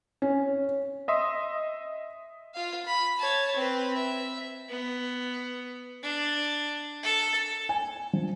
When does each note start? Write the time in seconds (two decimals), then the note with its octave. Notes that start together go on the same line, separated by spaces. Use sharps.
0.22 C#4
1.08 D#5 E5 C6 D#6
2.54 F4 F5
2.86 B5
3.19 C#5 A5
3.56 C4 B4
3.96 E5
4.69 B3
6.03 D4
7.03 A4
7.69 G#5
8.13 F3